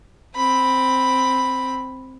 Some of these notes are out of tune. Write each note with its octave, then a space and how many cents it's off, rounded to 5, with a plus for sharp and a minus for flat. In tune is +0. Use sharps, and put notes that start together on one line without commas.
C4 +0 B5 +0